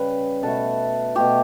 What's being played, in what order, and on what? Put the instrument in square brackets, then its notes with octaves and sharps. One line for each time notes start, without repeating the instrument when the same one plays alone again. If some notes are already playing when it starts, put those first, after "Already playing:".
Already playing: [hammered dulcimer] C#3 G3 B4
B2 A3 A4
B2 A3 G4